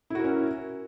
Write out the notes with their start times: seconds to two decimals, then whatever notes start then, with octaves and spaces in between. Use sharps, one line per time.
0.10 E4
0.15 F#4
0.20 A#4
0.24 C#4